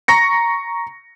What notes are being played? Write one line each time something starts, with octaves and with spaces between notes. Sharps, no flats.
A#5 C#6 A#6 C#7